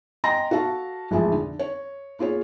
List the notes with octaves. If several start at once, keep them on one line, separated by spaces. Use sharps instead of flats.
D#5 G5 G#5 A#5 C6 A#6
F#4 A4 F5 A5
A1 F2 G#3 E5 G#5 A5
D3
C#5
A#3 F4 G#4 C#5